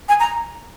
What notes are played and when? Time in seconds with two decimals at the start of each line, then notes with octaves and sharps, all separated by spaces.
0.09 G#5
0.20 A#5